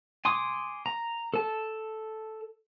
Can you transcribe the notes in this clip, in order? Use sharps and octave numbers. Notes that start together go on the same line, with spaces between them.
G#5 C6 D6 D#6
A#5
A4 A5